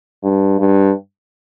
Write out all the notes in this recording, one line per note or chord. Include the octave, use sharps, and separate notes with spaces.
G2
G2